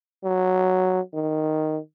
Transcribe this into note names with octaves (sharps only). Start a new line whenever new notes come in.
F#3
D#3